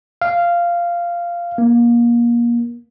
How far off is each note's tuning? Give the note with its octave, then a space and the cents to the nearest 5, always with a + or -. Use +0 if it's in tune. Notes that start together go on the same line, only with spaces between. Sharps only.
F5 -10
A#3 +25